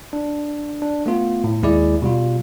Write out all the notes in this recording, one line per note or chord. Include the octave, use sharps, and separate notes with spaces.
D4
D4
A3 B3 F4
A2
D#2 G#3 E4 G#4 D5
B2 G3 F4